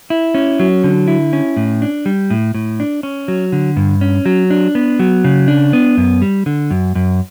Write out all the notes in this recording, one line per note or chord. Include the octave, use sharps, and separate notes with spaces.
E4
C#4
F#3
D3
E4
C#4
A2
D4
G3
A2
A2
D4
C#4
F#3
D3
G2
C#4
F#3
D4
B3
F#3
C#3
D4
B3
F#2
G3
D3
F#2
F#2